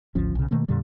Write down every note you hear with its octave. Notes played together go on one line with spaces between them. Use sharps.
G#1 D2 F3 C#4
B1 C#3
B2 D#3 A3 A#3
F2 A#2 D3 G3